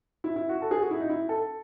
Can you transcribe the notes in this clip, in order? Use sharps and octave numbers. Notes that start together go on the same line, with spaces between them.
E4
E4
F#4
A4
G#4
F#4
E4
D#4
E4
A4